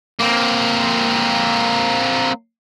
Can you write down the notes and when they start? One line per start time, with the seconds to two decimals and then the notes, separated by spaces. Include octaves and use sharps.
0.20 A#3 C4